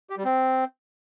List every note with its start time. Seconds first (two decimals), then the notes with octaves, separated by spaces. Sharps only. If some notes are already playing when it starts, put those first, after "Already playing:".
0.10 G4
0.17 G3
0.25 C4